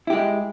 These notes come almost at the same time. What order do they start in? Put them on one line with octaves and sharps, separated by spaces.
E4 G4 G#3